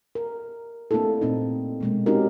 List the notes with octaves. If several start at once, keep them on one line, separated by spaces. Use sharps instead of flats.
A#4
A3 A#3 C4 D4 E4 A4
A#2 C4 D#4
B2 G#3 A#3
C4 C#4 D#4 F#4 G4 A#4